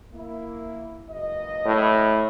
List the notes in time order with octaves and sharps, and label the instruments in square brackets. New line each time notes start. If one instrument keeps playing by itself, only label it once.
[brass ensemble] A#3 E4
F#1 C#2 D#5
[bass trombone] A2